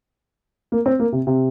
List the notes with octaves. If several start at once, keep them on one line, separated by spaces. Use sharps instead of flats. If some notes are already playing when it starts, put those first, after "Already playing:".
A#3
C4
A#3
C3
C3